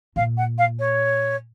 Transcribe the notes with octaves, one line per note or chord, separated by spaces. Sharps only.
A#2 F5
F#5
F5
C#5